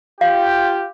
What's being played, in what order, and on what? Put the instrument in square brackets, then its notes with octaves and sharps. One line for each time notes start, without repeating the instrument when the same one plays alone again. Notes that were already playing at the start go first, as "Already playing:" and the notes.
[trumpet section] F4 G4 [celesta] F5